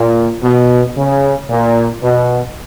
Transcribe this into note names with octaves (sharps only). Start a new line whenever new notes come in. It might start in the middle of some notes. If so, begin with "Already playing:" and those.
Already playing: A#2
B2
C#3
A#2
B2